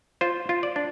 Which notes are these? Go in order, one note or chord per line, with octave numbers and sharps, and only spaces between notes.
F4 C5
F4
D5
D4